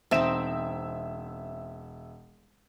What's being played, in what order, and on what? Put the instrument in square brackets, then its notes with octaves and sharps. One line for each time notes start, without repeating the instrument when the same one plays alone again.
[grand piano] E1 E5 E7 [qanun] C4 D#4